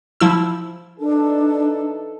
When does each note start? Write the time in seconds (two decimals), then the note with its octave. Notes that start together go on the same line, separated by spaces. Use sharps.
0.20 F3 E4 E6
1.00 E3 D4 D#4 A4